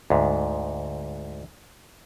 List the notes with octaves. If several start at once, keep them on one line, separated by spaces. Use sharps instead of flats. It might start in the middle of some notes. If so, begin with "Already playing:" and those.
D2 G#2